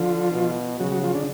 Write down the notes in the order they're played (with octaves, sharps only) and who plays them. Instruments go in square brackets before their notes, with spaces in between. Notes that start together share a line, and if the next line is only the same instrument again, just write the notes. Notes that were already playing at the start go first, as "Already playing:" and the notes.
Already playing: [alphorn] D3 [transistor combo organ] F3 F4
[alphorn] B2
[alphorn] C#3 [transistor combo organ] F#3 F#4
[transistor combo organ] F#3 F#4
F3 F4
D3 D4